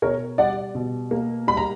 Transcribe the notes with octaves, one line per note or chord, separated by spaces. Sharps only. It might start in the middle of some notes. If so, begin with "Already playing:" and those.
B2 A#4 C#5
G3 D5 F#5
B2
A#3
G3 B5
A#5